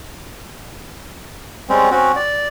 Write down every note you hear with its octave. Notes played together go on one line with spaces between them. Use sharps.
G3 G#3 C4 C#4
C4 C#4 F#4
D5